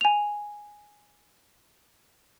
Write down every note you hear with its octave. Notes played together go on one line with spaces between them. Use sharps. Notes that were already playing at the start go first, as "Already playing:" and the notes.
G#5 F7